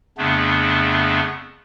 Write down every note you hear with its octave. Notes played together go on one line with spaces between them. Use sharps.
F2 C#3 A3 B3 D4